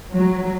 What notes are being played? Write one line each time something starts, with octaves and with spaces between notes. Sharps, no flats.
F#3